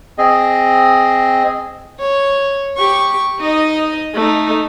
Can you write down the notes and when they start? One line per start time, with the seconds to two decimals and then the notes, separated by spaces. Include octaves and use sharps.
0.18 C4 G#4 D#5
2.00 C#5
2.77 G4 C#6
3.40 D#4 D#5
4.15 A3 D#4